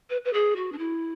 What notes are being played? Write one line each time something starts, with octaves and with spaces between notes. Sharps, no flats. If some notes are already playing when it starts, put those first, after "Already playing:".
B4
B4
G#4
F#4
D4
E4